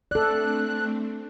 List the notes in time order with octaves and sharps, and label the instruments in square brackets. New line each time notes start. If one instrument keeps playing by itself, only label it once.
[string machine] A3 C4 D4 [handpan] A4 D5 [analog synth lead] F#6